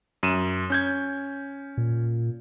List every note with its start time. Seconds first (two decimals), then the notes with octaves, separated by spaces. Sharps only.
0.23 F#2 D#7 E7
0.70 C#4 G6 G#6
1.77 A#2